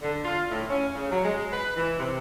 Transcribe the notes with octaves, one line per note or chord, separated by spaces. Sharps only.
D3
F4
A2
C#4
C#3
F#3
G#3
B4
E3
C3